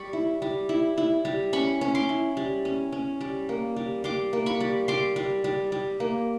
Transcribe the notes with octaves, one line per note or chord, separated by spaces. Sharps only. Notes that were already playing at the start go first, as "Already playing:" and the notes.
Already playing: G3 B5 C#6
E4
G3
E4
E4
G3
C#4 B5 C#6
C#4
C6 D6
E4
G3
C#4
C#4
G3
A#3
G3
G3 C6 D6
A#3
B5 C#6
G3
G3 C6 D6
G3
G3
G3
A#3